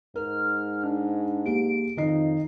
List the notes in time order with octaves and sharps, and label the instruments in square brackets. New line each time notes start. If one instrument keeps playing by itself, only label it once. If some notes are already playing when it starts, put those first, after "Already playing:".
[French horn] G#2 [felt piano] A#4 [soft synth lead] F6
[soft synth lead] D4
[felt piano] A#3 G4 G#4 [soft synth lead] D7
[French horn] F2 [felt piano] D#3 D#4 C7 [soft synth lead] D#5